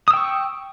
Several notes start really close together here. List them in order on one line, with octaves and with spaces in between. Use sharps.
D#6 E6 G5 C#6